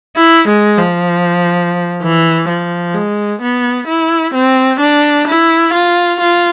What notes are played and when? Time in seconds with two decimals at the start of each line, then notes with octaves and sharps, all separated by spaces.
0.16 E4
0.48 G#3
0.78 F3
2.02 E3
2.49 F3
2.94 G#3
3.42 B3
3.88 E4
4.34 C4
4.80 D4
5.27 E4
5.73 F4
6.20 F4